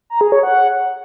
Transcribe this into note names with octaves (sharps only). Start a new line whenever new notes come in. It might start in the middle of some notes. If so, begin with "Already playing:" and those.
A#5
G#4
C#5
F#5